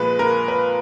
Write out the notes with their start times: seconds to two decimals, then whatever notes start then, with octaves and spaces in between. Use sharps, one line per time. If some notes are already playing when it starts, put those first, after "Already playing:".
Already playing: A#2 F3 G#3 B4
0.19 A#4
0.48 B4